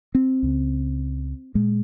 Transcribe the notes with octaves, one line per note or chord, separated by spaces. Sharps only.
C4
C#2 C#3
A#2 G#3